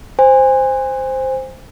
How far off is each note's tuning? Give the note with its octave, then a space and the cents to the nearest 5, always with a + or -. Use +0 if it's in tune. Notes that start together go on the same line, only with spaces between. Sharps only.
C5 +0 G#5 -30